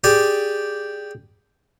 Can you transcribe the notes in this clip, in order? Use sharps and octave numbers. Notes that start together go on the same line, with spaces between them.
G4 G#4 D5